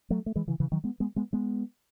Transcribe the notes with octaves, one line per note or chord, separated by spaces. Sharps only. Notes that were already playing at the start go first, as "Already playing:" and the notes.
F#3 A3
A3
E3 G#3
C#3 E3
C#3 E3
D#3 F#3
G#3 B3
G#3 B3
G#3 B3
G#3 B3